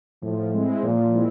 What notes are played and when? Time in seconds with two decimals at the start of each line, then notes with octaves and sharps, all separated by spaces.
0.22 A2 F3
0.53 G#3 C4 E4
0.83 A#2 F3
1.14 G#3 C4 E4